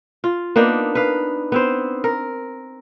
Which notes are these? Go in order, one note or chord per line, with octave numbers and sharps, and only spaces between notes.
F4
A#3 B3 D4 D#4
B4 F5
B3 C4 C5
A#4